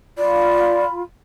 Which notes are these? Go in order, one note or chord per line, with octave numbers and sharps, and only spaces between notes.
F4 D5 B5